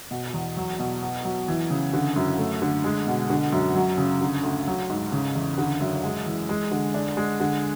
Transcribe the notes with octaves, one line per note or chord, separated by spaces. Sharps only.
B2
E2
F#3
B2
B3
F#3
E3
C#3
D3
F#2
A3
D3
G#3
B2
D3
F#2
F#3
C#3
D3
D2
F#3
G#2
C#3
E2
D3
F#2
G#3
E3
G#3
D3
D4
G#3
D3